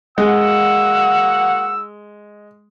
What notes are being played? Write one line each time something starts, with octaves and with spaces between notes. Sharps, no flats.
G#3 A#3 F#4 F#5 E6